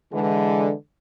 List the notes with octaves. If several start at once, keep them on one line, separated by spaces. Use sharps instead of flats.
D3 E3 G#3